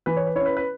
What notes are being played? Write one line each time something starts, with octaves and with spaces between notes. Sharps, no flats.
E3 B4
C#5
B4
C#4 E4 C#5
B4
B4